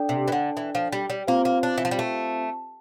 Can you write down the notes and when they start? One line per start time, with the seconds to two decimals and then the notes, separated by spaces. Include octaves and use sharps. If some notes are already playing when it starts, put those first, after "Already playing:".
Already playing: D4 A4 D5 G5
0.09 C3
0.28 E3
0.32 D3
0.57 E3
0.75 F3
0.92 G3
1.10 G3
1.27 A#3 C4 F4 C5 F5
1.45 A#3
1.63 D4
1.78 E3
1.85 F3
1.91 G3
1.99 A3